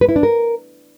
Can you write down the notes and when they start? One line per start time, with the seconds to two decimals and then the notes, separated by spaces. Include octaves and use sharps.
0.01 B4
0.09 E4
0.16 D4
0.23 A#4